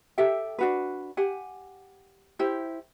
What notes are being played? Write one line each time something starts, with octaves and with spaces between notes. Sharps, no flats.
G4 A4 E5 G5
D4 F#4 B4
G4 F#5 G#5
E4 G4 C5